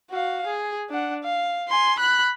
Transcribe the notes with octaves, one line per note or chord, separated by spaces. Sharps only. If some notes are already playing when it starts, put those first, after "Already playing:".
F#4 F5
G#4
D4 F#5
F5
G#5 C6
B5 F#6